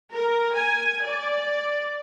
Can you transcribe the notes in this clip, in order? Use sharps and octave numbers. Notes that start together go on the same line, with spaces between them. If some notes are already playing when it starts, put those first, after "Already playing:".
A#4
G#5
D5